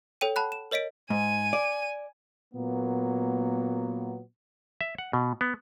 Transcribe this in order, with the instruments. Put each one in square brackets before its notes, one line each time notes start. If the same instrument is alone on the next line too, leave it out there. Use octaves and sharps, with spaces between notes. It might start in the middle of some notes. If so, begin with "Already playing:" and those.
[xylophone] A4 C#5 G5 D#7
F#5 A5 B5 F#6
E7
A#4 C#5 D#5 B6 D7
[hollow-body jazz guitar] G#2 [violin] G#5 D#7
[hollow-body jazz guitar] D5
[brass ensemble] A#2 F#3 A#3 B3
[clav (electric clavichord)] E5
F#5
B2
B3